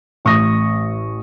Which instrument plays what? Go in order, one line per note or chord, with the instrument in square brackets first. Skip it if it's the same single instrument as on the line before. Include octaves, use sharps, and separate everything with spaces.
[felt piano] A1 C#6 D#6 A#6